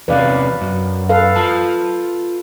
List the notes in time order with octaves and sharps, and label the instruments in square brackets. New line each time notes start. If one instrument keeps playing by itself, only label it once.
[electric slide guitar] E2 C3 C#4 [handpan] B4 D5 F5
[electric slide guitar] F#2
[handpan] A4 B4 F5
[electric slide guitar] F4 A5